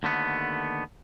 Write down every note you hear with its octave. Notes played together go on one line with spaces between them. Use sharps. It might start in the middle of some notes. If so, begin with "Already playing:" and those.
D#2 D3 A3 B3